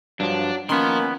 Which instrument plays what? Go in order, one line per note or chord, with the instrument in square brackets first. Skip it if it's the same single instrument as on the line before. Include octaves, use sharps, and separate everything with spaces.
[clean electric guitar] G2 F3 [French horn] F#3 [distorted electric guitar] D4
[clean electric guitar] D#3 B3 [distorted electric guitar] F3 C6 [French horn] A#3 [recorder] C#4